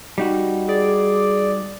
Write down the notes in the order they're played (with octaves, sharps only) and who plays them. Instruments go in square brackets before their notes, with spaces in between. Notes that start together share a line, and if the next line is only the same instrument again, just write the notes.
[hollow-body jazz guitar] G3 D#4 F#4
[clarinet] G#4 [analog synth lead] D5